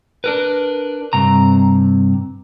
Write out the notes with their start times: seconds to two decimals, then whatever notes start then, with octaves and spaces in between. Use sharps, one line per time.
0.24 D4 A#4 B4
1.13 G2 C3 A#5